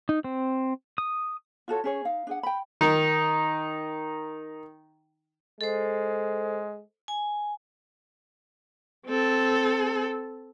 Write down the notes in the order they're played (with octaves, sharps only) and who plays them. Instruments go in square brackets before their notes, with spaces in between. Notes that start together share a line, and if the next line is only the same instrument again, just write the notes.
[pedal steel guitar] D#4
C4
D#6
[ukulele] F4 F#4 A4 C#5
C#4 G#4 C#5
D#4 F5
D4 G#4 F#5
G5 B5
[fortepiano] D#3 D#4
[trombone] G#3 [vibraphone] A4 C5
[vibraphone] G#5
[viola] C4 A4